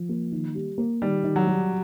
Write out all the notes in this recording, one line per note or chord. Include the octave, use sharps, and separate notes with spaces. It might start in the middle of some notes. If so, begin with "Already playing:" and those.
Already playing: F3
A#3
D#3
G3
A#3
D#3 G3
D#3
F#3
G3